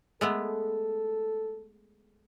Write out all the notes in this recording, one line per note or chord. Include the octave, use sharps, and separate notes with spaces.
G#3 A3 B3 A4